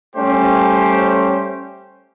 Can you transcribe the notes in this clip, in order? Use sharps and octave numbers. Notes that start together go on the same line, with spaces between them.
G3 A3 C#4 G4 C5